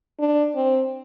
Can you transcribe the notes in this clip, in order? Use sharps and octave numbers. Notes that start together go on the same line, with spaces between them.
D4
C4